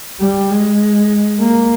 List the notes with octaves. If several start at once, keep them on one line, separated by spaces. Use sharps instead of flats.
G3
G#3
A#3